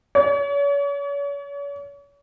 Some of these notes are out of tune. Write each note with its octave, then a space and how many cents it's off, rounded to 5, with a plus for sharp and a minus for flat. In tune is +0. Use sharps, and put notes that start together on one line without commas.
C#5 +40